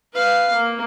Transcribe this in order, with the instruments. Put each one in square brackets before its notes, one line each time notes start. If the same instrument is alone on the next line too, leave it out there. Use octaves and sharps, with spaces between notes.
[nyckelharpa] B4 F5
A#3